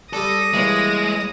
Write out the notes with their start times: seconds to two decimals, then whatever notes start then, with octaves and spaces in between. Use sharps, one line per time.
0.13 G3 D4 A4 D#6 A#6
0.53 E3 G3 G#3 A#3 C#5